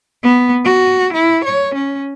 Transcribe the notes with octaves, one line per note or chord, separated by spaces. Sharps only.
B3
F#4
E4
C#5
C#4